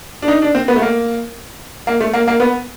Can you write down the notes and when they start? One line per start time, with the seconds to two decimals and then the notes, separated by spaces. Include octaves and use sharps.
0.22 D4
0.28 D#4
0.42 D4
0.55 C4
0.68 B3
0.76 A3
0.82 A#3
1.87 A#3
2.01 A3
2.14 A#3
2.28 A#3
2.40 B3